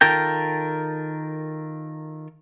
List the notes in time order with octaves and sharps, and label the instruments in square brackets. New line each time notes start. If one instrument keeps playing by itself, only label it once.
[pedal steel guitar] D#3 F4 A4 A#4 G5